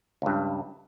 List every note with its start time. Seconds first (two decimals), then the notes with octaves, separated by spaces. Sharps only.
0.22 C#2 G2